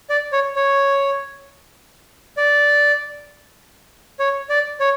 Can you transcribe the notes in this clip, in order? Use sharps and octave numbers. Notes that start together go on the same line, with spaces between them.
D5
C#5
C#5
D5
C#5
D5
C#5